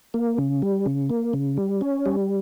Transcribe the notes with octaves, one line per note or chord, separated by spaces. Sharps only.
A#3
C#3
G3
C#3
A#3
C#3
G3
C#4
G3